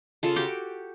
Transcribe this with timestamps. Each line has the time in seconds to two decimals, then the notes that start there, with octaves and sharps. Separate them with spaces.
0.23 C#3 F4 A4
0.36 F#4 G4 G5 D6